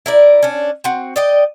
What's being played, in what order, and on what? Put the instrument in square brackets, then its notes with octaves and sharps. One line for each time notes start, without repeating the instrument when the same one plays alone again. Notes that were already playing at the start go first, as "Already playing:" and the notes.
[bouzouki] E4 A#4 D5
C#4 D4
C4 F#4
D5 D#5 G5